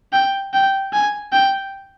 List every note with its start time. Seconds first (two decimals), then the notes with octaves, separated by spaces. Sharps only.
0.12 G5
0.53 G5
0.93 G#5
1.32 G5